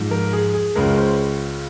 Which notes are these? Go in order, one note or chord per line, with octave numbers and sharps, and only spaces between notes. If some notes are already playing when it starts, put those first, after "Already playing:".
Already playing: G#2 F3 G#3
A#4
G#4
G#4
C#2 C#3 G#3 A#4
C5